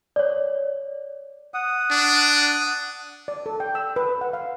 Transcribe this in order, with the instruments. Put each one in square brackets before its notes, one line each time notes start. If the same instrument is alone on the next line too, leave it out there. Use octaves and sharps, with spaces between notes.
[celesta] C#5 D5
[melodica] F#5 D#6
[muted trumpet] D4
[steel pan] D5
A4
G5
E6
B4
F#5
F5